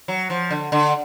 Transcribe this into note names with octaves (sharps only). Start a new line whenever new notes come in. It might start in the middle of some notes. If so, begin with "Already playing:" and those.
F#3
F3
D3
D3